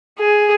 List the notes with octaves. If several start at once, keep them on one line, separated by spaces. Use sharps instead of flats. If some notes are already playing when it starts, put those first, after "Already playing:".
G#4